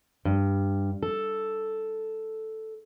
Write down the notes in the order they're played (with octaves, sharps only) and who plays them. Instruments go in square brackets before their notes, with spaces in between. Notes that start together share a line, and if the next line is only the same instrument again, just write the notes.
[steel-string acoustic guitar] G2
A4